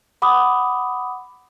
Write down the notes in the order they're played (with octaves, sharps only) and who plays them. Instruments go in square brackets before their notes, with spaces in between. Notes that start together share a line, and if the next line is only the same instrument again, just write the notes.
[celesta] F#5 B5 D6 D#6